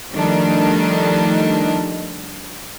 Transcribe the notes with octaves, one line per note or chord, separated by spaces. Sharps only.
D#3 F3 G3 A3 D4 D#4